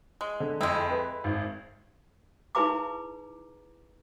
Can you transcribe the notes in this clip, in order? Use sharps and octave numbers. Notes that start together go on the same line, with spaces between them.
G#3
D3
F2 G#3 E4
B4
G#1
D#4 E4 G#4 B4 A#5 D6